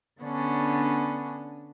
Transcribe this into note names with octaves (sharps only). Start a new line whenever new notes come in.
D3 B3 C#4 D4